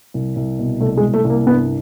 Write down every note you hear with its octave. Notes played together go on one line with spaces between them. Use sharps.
C2
C2
B2
C2 A3
G#3
C2
A3
C2
A#3
G2 B3